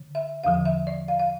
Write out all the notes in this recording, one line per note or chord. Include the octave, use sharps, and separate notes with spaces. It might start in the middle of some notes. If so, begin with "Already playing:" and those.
Already playing: D3
E5
E2 D3 F3 F5
E5
D5
F5
F5